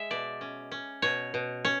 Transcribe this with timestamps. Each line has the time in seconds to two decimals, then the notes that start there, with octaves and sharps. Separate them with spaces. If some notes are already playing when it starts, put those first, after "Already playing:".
Already playing: G#3 E5
0.11 B2 D5
0.41 C#4
0.71 C#4
1.02 B2 C#5
1.34 B2
1.65 C#4 C#5